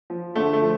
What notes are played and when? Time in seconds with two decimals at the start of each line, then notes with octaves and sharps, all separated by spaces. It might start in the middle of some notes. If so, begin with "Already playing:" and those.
0.10 F3
0.35 D3 A3
0.53 A3
0.62 F3